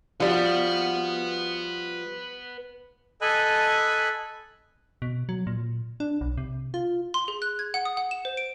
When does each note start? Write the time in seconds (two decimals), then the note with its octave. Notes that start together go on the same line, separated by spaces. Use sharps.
0.20 F3 G3 F#4 B4 F#5
3.21 A4 D#5 G#5 B5 F#6
5.02 B2
5.29 F#3
5.47 A#2
6.00 D4
6.21 B1
6.37 C3
6.74 F4
7.14 C6
7.28 G#4
7.42 F#6
7.59 G#6
7.74 F#5
7.85 D#6
7.97 F#5
8.11 E7
8.25 C5
8.37 D7